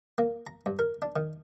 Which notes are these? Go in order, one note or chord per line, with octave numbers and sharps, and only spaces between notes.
A#3
A#5
G2
A#4
D4
D#3